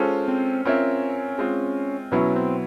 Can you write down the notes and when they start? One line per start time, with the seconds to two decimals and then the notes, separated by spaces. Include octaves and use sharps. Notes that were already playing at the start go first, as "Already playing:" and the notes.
Already playing: G#3 C#4 F4 A4 C5
0.28 C4
0.65 C4 C#4 F4 A#4 C#5 E5
1.38 G#3 C4 F4
2.12 B2 F#3 B3 C#4 E4
2.36 C4